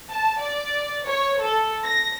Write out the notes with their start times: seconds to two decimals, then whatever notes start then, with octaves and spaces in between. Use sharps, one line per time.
0.11 A5
0.39 D5
1.06 C#5
1.40 A4
1.85 A#6